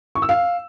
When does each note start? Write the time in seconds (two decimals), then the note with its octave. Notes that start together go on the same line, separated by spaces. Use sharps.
0.15 C#6
0.22 E6
0.29 F5